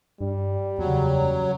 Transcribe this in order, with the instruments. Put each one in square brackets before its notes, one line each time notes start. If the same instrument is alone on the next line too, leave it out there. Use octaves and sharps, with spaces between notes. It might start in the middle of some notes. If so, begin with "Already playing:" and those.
[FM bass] G2 [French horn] G3
[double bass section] F#1 C#3 [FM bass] E2 [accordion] F#3